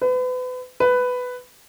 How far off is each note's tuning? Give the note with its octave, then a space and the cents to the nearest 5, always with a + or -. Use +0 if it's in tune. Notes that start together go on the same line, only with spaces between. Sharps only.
B4 +35
B4 +10